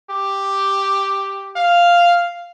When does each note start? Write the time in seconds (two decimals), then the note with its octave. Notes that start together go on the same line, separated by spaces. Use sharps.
0.10 G4
1.56 F5